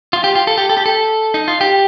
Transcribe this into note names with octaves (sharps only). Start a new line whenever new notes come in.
F4
G4
F4
A4
G4
A4
G4
A4
D#4
F4
G4